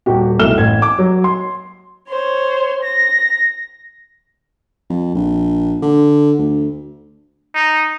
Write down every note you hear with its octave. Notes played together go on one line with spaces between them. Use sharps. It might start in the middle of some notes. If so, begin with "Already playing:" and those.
D#1 G3 F#4 G4
F1 B1 E4 F6 E7 G7
A1 G#6
D6
F#3
C6
C5 C#5
A#6
F2
A#1
D3
D2
D#4